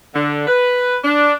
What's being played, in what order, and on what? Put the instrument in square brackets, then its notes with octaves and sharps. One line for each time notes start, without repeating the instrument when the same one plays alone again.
[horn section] D3
B4
D4